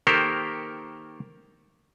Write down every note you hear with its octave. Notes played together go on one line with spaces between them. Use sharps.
D#3 A#3 G4 A4 A#4 C5